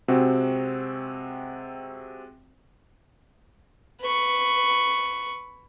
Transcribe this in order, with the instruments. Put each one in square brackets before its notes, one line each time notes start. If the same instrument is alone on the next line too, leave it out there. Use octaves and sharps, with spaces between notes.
[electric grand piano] C3 G#3 C4 F#4
[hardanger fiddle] B4 C#6